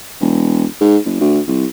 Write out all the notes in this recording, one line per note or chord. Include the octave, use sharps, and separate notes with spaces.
E1
G#2
F#1
D2
C2